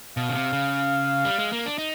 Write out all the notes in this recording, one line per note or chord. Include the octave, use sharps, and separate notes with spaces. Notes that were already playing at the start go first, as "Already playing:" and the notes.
B2 F5
C#3
C3
C#3
G3
G#3
A#3
D4
D#4